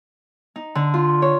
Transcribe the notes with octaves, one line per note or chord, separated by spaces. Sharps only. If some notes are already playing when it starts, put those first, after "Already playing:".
D#4
D3
F4
C#5